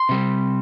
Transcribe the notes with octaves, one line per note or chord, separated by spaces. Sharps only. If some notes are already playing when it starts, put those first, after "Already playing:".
Already playing: C6
C3 G3 C4